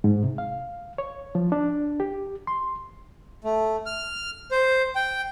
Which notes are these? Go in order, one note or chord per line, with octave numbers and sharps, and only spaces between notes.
G#2
C3
F5
C#5
F3
D4
G4
C6
A3
F6
C5
G5